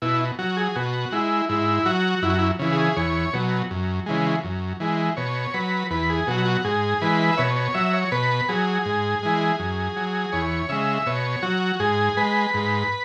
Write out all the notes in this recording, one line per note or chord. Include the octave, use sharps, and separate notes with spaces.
B2 E4
F#3 F#4
G#4
B2 F#4
G#3 E4
G#2 E4
F#3 F#4
F#2 E4
F#4
E4
C#3 E3
G#4
E2 C#5
B2 F#3
F#2
C#3 E3 G#3
F#2
E3 G#3
B2 C#5
F#3 B4
E2 B4
G#4
B2 F#3 F#4
F#4
G#2 G#4
E3 G#3 B4
E5
B2 C#5
C#5
F#3 E5
C#5
B2 B4
F#3 G#4
G#2
E3 G#3
F#2
F#3
E2 C#5
C#3 G#3 E5
B2 C#5
F#3 F#4
G#2 G#4
G#3 B4
G#2